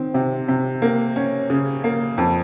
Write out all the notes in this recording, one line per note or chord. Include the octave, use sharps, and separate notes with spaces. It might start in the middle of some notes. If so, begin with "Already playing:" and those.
Already playing: D#3 C4
C3
C3
A#3
C#4
C#3
A#3
F2